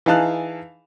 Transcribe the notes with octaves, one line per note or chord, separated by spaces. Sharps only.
E3 D#4 G#4 F5 A5 F#6